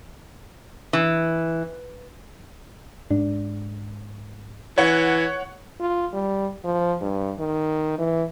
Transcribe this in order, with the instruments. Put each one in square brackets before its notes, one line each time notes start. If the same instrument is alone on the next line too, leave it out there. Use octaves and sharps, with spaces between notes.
[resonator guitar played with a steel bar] E3
[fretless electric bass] G#2 D4
[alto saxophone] E3 [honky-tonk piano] C#5 F#5
[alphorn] F4
G3
F3
G2
D#3
E3